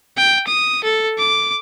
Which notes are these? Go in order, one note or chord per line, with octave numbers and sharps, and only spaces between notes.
G5
D#6
A4
D6